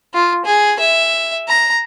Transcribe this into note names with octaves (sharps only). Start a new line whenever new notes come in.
F4
G#4
E5
A#5